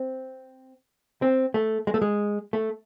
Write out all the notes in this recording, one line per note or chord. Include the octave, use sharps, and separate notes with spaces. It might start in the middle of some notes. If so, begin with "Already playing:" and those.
Already playing: C4
C4
A3
G#3
A3
G#3
A3